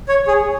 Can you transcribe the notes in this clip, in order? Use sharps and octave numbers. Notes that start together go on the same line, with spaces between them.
C#5
G#4